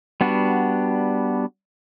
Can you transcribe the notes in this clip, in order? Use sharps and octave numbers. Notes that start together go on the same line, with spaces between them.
G3 B3 D4 F#4